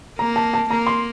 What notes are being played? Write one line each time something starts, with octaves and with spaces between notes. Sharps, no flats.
A#3 A#5
A5
A5
A#3 A#5
C6